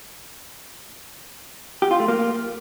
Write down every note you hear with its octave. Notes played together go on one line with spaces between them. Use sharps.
G4
F4
A3
A#3